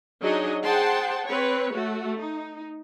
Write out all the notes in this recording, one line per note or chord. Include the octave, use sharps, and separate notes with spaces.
F#3 D4 D#4 G#4 C#5 D#5
G#4 C5 F#5 G5 A5 C6
C4 B4 C#5
A3 F#4
D#4